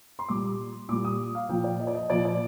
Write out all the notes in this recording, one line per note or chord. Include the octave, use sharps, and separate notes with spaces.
C6
A#2 G3 D6
A#2 G3 D6
D#6
F5
A#2 F3 G5
D5
D#5
D5
D#5
A#2 F3 D5
D5